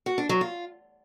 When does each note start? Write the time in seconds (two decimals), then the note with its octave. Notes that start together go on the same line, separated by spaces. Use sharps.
0.06 F#4
0.18 D4
0.29 F#3
0.41 F4